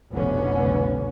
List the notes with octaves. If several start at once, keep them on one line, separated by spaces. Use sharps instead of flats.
F1 C2 B2 D3 B3 C#4